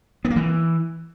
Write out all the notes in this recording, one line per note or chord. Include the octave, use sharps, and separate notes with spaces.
B3
A#3
E3